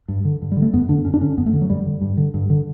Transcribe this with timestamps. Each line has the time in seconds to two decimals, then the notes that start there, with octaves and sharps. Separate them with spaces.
0.08 G2
0.25 D3
0.42 G2
0.52 G3
0.57 D3
0.62 A3
0.74 F#2 B3
0.89 D3 D4
1.05 F#2 C#4
1.14 D4
1.21 D3 C#4
1.38 F#2 B3
1.46 A3
1.53 D3
1.62 F#3
1.70 F#2 G3
1.86 D3
2.01 G2
2.17 D3
2.34 G2
2.50 D3